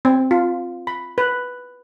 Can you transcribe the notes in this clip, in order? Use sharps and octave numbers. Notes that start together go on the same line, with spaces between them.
C4
F4
B5
B4